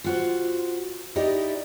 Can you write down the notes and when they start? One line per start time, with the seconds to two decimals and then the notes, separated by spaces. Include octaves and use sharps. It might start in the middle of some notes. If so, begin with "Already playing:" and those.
0.04 F4 F#4 C5
1.16 D#4 E4 G4 D5 D#5